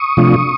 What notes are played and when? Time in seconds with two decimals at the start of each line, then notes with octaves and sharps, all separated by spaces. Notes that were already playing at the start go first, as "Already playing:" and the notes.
Already playing: C#6 D#6
0.17 C3 F3 A3 D4 F4